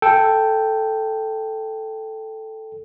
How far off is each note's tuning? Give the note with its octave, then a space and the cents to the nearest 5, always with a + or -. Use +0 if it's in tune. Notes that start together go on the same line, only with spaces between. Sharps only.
A4 +0 G5 +0